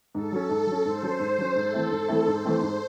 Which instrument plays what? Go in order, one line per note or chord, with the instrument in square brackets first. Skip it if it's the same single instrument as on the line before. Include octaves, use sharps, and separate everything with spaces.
[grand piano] G#2 [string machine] A4
[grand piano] F#3 C#4
G#2
F#3
C#4
[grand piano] G#2 [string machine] C5
[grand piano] F#3 C#4
G#2
F#3 C#4
[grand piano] G#2 [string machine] A4
[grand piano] E3 A3 C4 E4
G#2
E3 A3 C4 E4
[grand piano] G#2 [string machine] C5
[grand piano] E3 A3 C4 E4
G#2